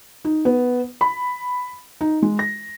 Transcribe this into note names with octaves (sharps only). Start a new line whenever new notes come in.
D#4
B3
B5
D#4
G#3
A#6